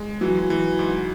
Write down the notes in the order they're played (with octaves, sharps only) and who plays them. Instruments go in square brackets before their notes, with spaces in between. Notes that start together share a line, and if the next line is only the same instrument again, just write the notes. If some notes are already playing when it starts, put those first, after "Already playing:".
Already playing: [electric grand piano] G#3
[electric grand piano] E3 [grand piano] F#3
[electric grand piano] E3
G#2